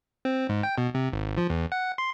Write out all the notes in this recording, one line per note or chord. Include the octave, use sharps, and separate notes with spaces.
C4
G#2
G5
B2
C3
G#1
F3
E2
F#5
C6